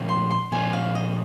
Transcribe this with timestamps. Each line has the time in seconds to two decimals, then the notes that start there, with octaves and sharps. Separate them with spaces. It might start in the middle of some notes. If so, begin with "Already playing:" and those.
Already playing: A#2 F3 G#3 C#4 F4
0.09 C6
0.30 C6
0.52 A#2 F3 G#3 C#4 F4 G#5
0.73 F5
0.95 D#5